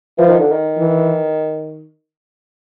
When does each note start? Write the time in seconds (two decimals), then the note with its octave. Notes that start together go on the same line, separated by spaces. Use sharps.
0.18 E3 F3
0.29 D#3
0.40 D3
0.52 D#3
0.78 E3